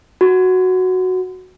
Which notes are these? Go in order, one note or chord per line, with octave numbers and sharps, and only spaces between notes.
F#4